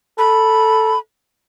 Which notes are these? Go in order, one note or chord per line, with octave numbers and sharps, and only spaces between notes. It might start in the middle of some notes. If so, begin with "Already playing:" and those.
A4 B5